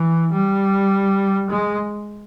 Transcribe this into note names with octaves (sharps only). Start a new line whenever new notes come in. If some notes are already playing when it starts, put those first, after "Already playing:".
Already playing: E3
G3
G#3